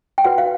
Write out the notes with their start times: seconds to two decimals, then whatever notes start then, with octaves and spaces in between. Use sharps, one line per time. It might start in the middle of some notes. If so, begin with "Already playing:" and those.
0.18 G5
0.24 F#4 B4 F#5
0.38 F5